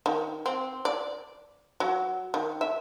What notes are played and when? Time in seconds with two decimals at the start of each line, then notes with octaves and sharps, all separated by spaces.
0.06 D#3
0.46 C4
0.85 D5
1.80 F#3
2.34 D#3
2.61 E5